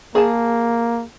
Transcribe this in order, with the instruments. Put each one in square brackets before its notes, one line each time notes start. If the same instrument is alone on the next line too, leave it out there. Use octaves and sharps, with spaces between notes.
[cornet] A#3 [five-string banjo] G#4 G#5 A5